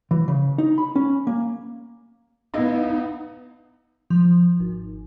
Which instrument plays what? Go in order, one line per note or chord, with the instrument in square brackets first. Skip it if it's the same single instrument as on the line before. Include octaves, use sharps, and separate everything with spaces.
[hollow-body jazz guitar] E3
C#3
D#4
B5
C#4
A#3
[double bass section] B3 [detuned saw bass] D#4 [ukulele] E4 D#5 F5
[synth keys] F3
G#1